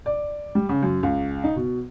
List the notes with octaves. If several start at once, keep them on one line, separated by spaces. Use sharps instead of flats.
D5
G3
C#3
F#2
C#2
D#4
B2